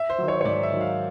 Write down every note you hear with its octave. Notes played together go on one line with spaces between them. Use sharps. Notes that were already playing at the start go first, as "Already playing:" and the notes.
Already playing: E5
C5
D#3 F#3
C#5
C#5
G#2 D5
E5
D#3 F#3
F5